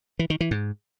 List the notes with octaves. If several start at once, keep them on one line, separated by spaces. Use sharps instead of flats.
E3
D#3
E3
G#2